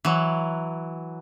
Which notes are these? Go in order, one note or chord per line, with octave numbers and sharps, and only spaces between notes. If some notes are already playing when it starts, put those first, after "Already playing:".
E3 F#3